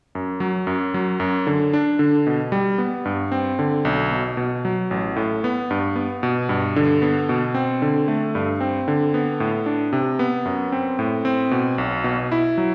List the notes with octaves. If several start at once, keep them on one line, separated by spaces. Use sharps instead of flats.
F#2
F#3
F#2
F#3
F#2
D3
D4
D3
B2
G3
B3
G2
C4
D3
B1
B2
B2
F#3
A1
A2
B3
G2
B3
B2
G2
D3
B3
B2
C4
D3
A3
G2
C4
D3
B3
A2
D4
C3
B3
F#2
C4
A2
C4
B2
B1
B2
E4
F#3